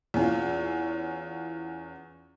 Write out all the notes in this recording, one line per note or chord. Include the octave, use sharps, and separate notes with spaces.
E2 C#4 F4